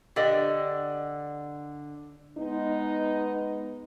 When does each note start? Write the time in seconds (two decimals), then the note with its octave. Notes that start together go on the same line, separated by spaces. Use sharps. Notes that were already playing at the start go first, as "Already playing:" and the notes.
0.16 D3 G4 D5 D#5
2.38 G#3 B3 D#4